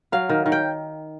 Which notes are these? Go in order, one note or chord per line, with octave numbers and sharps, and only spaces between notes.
F#3 F5
D#3
D#3
G5